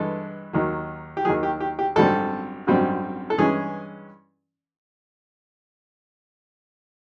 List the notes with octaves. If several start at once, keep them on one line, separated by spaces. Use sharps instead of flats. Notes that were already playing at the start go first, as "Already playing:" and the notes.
Already playing: G2 E3 G#3 A4
D#2 D#3 F#3
G4
D#2 D#3 F#3 G#4
G4
G4
G4
G#1 F#2 D3 G3 C4 A4
G#1 F#2 D3 G3 C4
A4
G2 E3 G#3 C#4 G#4